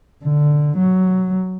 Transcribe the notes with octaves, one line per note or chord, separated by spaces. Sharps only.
D3
F#3